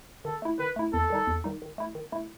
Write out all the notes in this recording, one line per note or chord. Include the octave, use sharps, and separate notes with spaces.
D#3 A4
A3 E4
D#3 B4
A3 E4
E2 A4
D#3 G3 D#4
E2
D#3 G3 D#4
D#3
A3 E4
D#3
A3 E4